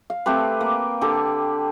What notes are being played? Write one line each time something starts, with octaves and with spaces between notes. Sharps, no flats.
F5
A3 C4 G4 B4
A#3 B4
D3 G4 A4 D5